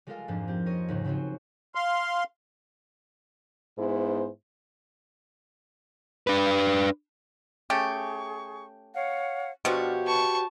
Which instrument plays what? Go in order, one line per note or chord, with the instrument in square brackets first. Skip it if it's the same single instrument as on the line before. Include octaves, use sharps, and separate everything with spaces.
[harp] G3 G#3 F4 A4 A#4 F5
F2 G#2 F3 A#3 D4
C4 G4
A#4 C5 C#5 D#5
D#2 G#2 C#3
C#3 F#3 C4 F4 F#4
[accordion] F5 C6
[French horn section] G#2 B3 E4 G#4 C5
[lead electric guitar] D4 B4
[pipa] A3 C#4 G4 [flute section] G#4 C#6
[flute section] C#5 F5 F#5
[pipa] B2 F3 [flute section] D4 F6 [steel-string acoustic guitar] F#4 G4 C#5
[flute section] B4 [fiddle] A5 C#6